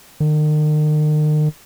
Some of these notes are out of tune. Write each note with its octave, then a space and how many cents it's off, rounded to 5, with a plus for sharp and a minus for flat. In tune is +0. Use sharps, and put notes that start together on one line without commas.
D#3 -40